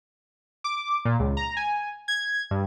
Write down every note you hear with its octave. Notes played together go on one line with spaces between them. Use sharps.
D6
A#2
C#2
A#5
G#5
G#6
G2